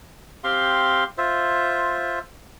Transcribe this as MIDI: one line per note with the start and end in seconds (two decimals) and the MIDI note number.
0.44 1.04 60
0.44 1.04 67
0.44 1.04 77
0.44 1.04 84
1.18 2.19 65
1.18 2.19 72
1.18 2.19 76